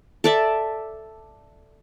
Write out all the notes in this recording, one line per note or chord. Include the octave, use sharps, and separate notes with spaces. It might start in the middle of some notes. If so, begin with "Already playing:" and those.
A4 D5 E5